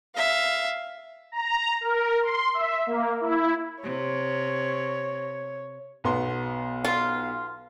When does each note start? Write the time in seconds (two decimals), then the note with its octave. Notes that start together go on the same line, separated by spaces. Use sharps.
0.15 E5 F5
1.32 A#5
1.81 A#4
2.23 C6
2.54 E5
2.87 A#3
3.21 E4
3.83 C3 C#5
6.04 B1 B3 C6
6.84 F4